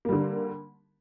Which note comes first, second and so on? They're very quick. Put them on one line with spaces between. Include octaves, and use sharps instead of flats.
A#3 G3 D3